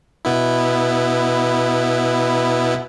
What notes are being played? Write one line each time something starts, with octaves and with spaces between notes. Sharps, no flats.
B2 B3 E4